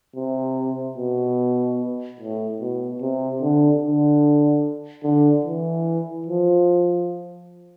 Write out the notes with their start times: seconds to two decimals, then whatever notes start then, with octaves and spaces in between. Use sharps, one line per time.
0.16 C3
0.97 B2
2.20 A2
2.61 B2
3.02 C3
3.41 D3
3.82 D3
5.04 D3
5.45 E3
6.26 F3